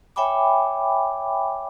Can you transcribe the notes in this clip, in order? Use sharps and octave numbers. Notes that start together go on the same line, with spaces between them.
C#5 E5 G5 G#5 B5 D6